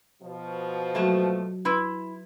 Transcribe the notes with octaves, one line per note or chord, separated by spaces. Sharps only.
B2 F3
F#3 A3 A#3 F#4 A5
E4 B4 C6 E6